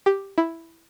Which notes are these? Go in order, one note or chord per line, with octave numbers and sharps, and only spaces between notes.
G4
E4